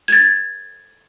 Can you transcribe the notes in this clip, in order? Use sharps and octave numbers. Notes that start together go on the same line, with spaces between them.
G#6 A6